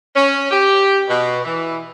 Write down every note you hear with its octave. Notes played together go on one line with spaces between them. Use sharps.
C#4
G4
B2
E3